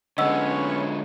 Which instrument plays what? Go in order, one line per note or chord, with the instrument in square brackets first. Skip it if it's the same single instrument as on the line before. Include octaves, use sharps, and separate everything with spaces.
[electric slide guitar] D3 G#3 [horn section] B3 C#4 C#5 [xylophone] D#5 F#5 E6